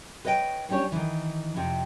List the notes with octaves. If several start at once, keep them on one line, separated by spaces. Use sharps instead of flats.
B4 C#5 D#5 F5 G5
G3 C#4 D4 G4 C#5
D#3 E3
F2 C3